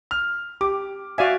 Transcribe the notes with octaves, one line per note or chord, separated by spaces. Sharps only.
F6
G4 D6
F#4 D5 E5 F5 G#5